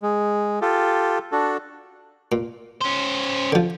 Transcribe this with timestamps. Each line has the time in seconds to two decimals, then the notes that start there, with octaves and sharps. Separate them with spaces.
0.02 G#3
0.62 F4 G4 A4
1.32 D4 F#4 A4
2.32 A#2
2.81 C#4 C5
3.52 D3 F3